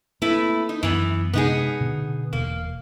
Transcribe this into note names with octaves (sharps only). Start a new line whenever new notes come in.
A3 A#3 C4 E4 B4
D#4
F#2 E3 B3
C3 G#3 B3 D#4 G#4
B2 D3
E1 A#3